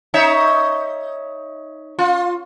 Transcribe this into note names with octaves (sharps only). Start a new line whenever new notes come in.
D#4 C#5 E5
F4